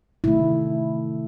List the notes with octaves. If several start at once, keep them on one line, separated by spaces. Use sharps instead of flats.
C3 D#3 A3 E4